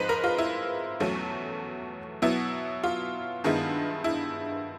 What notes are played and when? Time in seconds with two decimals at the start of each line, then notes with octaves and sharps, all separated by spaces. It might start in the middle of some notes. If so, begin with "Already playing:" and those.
Already playing: G#2 F3 G#3 C4 D#4 B4 C5
0.09 A#4
0.24 F4
0.38 E4
1.00 E2 B2 F#3 A3 C#4
2.22 B2 F#3 B3 E4
2.84 F4
3.44 G2 D#3 G#3 B3 E4
4.04 E4